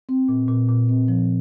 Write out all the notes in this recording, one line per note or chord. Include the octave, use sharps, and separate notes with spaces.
C4
A#2
A#2
A#2
C4
F3